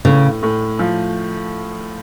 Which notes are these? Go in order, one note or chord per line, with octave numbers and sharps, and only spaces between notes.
A2 C#3
A2
F3